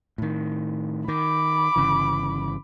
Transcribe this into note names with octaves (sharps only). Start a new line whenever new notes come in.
A2 D#3
D#3 B5 D6
G1 C#3 E3